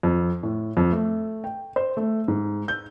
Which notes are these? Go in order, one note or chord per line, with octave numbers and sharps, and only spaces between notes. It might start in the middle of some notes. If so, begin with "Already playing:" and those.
F2
A2
F2
A3
G5
C5
A3
G#2
G6